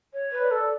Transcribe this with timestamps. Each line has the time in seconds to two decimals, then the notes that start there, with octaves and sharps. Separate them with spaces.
0.13 C#5
0.32 B4
0.42 D5
0.51 A4